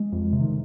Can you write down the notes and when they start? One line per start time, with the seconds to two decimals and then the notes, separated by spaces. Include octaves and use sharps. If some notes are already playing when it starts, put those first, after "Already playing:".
Already playing: G#3
0.12 F2
0.32 C3
0.40 D#3